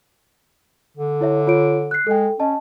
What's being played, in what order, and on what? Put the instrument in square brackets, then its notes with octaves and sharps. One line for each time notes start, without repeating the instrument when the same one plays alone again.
[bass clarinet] D3
[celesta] E4 C#5 E5
F4 C#5 D7
F#6 C7
[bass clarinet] G#3 [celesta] A4 G5
[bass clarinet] C#4 [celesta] D#5 A5